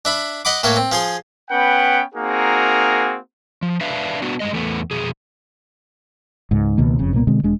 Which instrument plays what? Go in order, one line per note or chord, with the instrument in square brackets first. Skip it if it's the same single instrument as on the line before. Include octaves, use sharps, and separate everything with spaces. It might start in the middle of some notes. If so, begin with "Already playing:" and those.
[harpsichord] D4 E5 B5
D#5 F#5 B5 D6
A2 A#3 A4 C#5
C4
F3 G#4 G#5 C6
[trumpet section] B3 C#4 B4 F#5 G5
A#3 C4 D#4 F#4 G#4 A#4
[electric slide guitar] F3
D4 B4 E5 F5
B3 D4 F#4
G2 B2 G#3 D#5
E2 A3 B3
F2 B2 G#4
[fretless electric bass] C#2 G#2
C#2 B2 D#3 A#3
F#1 F2 C#3
C2 A#2 A#3 B3
B2 D3 G#3 C4
E1 G#3 D4